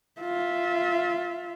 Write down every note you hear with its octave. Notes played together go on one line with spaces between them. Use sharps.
F4 E5